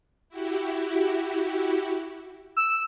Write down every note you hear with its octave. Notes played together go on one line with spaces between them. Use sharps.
E4 F#4 G4
E6